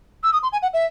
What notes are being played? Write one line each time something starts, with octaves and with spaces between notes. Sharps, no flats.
E6
D#6
C6
G#5
F#5
E5